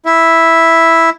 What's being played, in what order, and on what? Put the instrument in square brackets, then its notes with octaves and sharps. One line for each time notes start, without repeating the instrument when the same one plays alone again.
[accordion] E4 E5